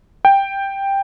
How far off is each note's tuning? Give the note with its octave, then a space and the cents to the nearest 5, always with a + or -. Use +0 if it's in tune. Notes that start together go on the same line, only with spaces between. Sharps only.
G5 +5